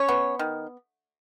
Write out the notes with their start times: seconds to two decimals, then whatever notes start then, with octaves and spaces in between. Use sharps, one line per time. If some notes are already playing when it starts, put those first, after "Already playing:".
Already playing: C#4 C#5
0.09 B3
0.39 D#3